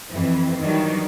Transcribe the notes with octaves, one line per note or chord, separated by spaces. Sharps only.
F2 E3
D#3 E3 F#3 G3 D4 D#4